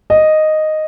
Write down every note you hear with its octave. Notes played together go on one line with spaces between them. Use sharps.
D#5